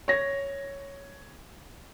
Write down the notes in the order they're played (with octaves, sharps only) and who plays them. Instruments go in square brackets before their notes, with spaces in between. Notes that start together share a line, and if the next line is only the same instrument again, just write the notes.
[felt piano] C#5 A#6